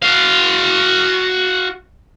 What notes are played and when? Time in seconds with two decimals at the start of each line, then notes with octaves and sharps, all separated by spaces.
0.03 F#4 F5